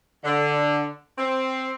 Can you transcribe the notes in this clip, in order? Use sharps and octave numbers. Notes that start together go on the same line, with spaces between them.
D3
C4